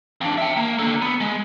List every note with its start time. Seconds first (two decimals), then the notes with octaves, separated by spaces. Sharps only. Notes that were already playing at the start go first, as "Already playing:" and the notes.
0.21 F2 D4
0.38 E5 G5
0.57 A#3
0.79 D3 A#3
1.02 B3
1.21 G#3